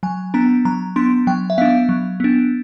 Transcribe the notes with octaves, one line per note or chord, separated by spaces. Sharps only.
F#3 G#5
B3 D4 A#5
F#3 A#5
B3 D4 C6
F#3 G5
E5
B3 D4 F5
F#3
B3 D4